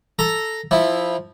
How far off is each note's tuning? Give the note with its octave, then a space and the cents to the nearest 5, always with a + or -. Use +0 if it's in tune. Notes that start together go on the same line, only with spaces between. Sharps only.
A4 +0 A#5 +0
F3 +0 E4 -15